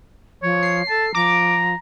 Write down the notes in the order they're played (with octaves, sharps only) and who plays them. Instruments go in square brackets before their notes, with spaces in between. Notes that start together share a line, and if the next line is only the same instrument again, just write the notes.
[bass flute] F3 [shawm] C#5
[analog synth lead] C7
[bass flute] A4 [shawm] A5
[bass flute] F3 [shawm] A#5 [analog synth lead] D6